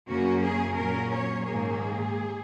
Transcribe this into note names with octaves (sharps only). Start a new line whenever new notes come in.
F#2 C#3 A#3 C#4 F#4
G#4
A#2 F#3 C#4 A#4
C#5
G#2 D#3 A#3 G#4